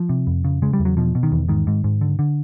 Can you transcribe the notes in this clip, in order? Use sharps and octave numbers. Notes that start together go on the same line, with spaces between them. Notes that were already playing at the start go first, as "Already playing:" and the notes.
Already playing: F3
C3
F2
C#3
C#3 G#3
G3
E2
F#3
B2 F3
B2
D#3
E2
G#2 D#3
G#2
G#2
D3
D3